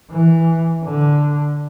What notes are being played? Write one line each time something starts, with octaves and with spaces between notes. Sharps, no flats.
E3
D3